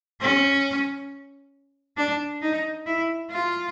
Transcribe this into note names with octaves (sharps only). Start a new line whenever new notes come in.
C#4
D4
D#4
E4
F4